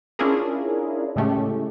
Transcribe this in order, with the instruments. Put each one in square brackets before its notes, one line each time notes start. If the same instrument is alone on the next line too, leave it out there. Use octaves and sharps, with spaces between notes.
[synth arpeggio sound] C#4 D4 E4 F4 G#4 A#4
A2 C#3 G#3 A3 C#4 G4